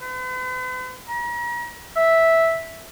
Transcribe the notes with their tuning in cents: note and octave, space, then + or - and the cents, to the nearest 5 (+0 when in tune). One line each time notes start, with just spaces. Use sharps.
B4 +45
A#5 +40
E5 -5